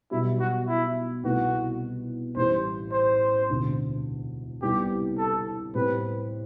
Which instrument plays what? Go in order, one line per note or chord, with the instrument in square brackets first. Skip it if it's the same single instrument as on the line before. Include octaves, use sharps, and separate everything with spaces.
[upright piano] B1 B2 G3 [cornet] E4
[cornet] F#4
E4
[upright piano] C2 B2 A3 E4 B4 [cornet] F#4
[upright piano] A1 A2 G3 [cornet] C5
[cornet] C5
[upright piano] E1 D2 C3
[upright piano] C2 C3 G3 B3 [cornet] G4
[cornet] A4
[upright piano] A2 G3 C4 G4 C5 [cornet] B4